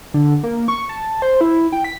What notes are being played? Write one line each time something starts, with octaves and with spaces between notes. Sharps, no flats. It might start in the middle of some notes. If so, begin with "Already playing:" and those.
D3
A#3
C#6
A5
C5
E4
G5
B6